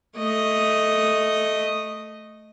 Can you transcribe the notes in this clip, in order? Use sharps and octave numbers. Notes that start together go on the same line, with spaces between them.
A3 D#5